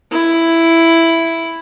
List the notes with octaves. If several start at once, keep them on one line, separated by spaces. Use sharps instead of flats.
E4